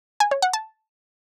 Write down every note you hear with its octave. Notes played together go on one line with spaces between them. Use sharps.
G#5
C#5
F#5
A5